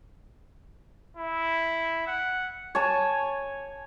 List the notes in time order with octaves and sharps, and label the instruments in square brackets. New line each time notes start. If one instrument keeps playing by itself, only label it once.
[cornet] E4
F#5
[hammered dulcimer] C#5 G#5 A5